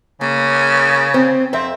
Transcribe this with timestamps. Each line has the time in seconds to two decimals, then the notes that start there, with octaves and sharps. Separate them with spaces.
0.21 C#3 A#3
1.14 C4
1.53 F2 C4 E5